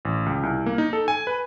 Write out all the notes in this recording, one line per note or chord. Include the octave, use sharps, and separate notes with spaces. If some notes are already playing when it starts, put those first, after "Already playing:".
A1
C#2
C2
A#3
D#4
A4
G#5
B4